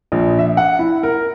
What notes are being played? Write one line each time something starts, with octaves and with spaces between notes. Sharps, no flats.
A#1
E5
F#5
E4
A#4